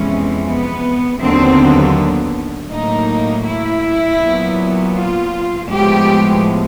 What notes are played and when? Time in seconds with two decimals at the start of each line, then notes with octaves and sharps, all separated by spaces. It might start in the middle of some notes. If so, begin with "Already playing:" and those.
Already playing: F2 C3 E3 G#3 B3 C#4
0.46 B3
1.20 D#2 D3 F#3 B3 C4
2.69 A2 F#3 A#3 D#4
3.45 E4
4.20 A#2 F#3 B3
4.94 F4
5.69 A2 F3 G#3 B3 G4